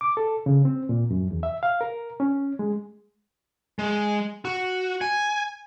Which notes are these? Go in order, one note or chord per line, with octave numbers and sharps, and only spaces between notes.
D6
A4
C#3
C4
A#2
F#2
E2
E5
F5
A#4
C#4
G#3
G#3
F#4
G#5